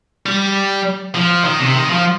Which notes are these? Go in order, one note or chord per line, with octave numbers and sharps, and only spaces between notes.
G3
F3
D#3
C3
D#3
F3